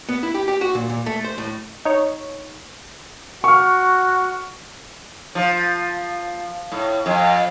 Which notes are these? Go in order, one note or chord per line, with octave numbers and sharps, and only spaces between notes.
B3
E4
G4
G4
F#4
A#2
A#2
A3
C5
A2
D#4 C#5
F#4 C#6 F6
F3
A2
F2